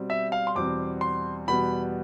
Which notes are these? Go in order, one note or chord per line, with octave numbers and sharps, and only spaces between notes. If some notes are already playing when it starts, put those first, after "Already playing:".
Already playing: B2 G3 C4
E5
F5
C6
E2 B2 G3 C4 D6
C6
E2 B2 G3 B3 B5